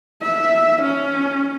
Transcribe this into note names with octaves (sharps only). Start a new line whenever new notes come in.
E5
C#4